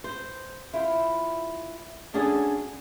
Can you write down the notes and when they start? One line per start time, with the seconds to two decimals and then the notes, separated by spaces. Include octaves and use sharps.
0.04 C5
0.73 E4 F4 C5
2.14 C#4 D4 F#4 G#4 A4